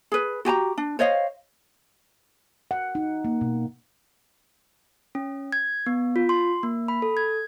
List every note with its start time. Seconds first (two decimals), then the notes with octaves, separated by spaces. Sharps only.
0.12 G#4 B4
0.45 F#4 G4 G#5 A#5
0.78 D4
0.99 C5 C#5 D#5 F5
2.71 F#5
2.95 D#4
3.25 A#3
3.41 B2
5.15 C#4
5.52 G#6
5.86 B3
6.16 F4
6.29 C6
6.63 A#3
6.88 B5
7.02 A4
7.17 G#6